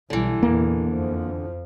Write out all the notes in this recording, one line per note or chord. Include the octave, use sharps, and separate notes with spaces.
B1 D3 E3 G3
E2 A#2 A#3
F2 F3